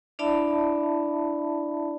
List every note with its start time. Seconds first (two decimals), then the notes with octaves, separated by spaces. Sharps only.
0.19 D4 E4 D5 E5 A5 B5